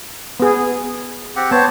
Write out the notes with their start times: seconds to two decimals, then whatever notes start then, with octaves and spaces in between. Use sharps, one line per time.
0.40 B3 G#4
1.36 C4 G4 F#5
1.51 B3 C5 C#5 A5